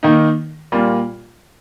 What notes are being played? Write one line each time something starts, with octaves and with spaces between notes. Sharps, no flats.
D#3 A#3 D#4
A#2 G3 A#3 F4